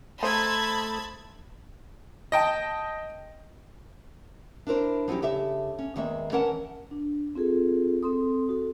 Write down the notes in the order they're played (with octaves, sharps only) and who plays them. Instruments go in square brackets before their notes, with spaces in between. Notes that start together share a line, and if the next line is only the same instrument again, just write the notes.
[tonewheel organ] A3 [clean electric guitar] D#4 E4 [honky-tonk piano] C5 [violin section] A5 B5 G#6
[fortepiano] D#5 G5 A5
[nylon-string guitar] D4 E4 A#4 C5
F3 F#3 C#4 E4 G4
C#3 G4 A4 E5
C#4
E2 D#3 G#3 A#3 E5
E3 C#4 A#4 C#5 F#5 A5
[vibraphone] D4
C4 F4 G#4 A4
C4 A4 C6 D#6
F#4 A4